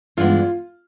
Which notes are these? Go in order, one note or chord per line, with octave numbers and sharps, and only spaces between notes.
G2 E3 G#3 B3 D4 F4